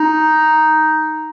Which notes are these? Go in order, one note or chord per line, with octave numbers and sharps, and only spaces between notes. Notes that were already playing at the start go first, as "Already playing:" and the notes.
Already playing: D#4